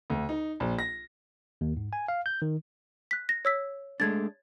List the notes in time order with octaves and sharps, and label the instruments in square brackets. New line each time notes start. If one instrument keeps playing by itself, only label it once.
[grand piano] D2
D#4
A#1
A#6
[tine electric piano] D#2
G#2
G#5
F5
G6
D#3
[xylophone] F#6 B6
A#6
C#5 E6 B6
[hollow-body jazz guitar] G#3 A3 D4 [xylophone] G#6 A6